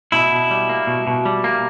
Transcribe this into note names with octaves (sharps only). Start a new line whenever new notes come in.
B2 E4
B2
G3
A#3
B2
B2
G3
A#3